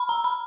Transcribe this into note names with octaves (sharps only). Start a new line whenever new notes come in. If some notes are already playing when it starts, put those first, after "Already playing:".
Already playing: B5
A#5
B5